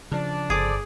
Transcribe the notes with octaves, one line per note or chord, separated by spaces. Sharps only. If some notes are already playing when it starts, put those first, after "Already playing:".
C#3 F3 D4
G1 G#4 A4 C5 D5 D6